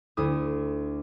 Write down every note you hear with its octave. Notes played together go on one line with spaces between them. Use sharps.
D2 E4 D#6